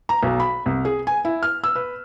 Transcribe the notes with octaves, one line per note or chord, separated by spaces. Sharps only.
A#5
B1
B5
C2
G#4
G#5
E4
F6
E6
B4